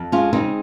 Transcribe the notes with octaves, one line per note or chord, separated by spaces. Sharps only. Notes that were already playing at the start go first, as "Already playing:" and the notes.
Already playing: F2
G#3 C#4 F4
C#3 C4 D#4